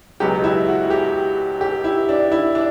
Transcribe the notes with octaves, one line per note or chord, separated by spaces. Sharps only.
C#2 B2 F#3 B3 G4
E4
F#4
G4
G4
E4
D4
E4
D4